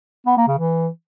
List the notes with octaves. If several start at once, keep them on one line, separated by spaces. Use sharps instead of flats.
B3
A#3
C#3
E3